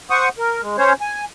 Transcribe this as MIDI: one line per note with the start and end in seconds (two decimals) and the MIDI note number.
0.10 0.29 72
0.10 0.29 78
0.10 0.29 85
0.10 0.29 87
0.38 0.61 70
0.62 0.77 56
0.78 0.93 61
0.78 0.93 72
0.78 0.93 73
1.01 1.25 80